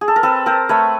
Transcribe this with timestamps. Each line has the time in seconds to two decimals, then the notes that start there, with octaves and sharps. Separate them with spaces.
0.01 G#4
0.08 A4
0.16 A#4
0.23 C4 A4 B4
0.46 C4 A#4 C5
0.69 A3 B4 C#5